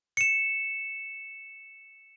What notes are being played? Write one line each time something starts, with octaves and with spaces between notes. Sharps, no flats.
C#7 E7